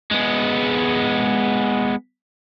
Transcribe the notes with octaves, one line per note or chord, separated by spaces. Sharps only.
G#3 B3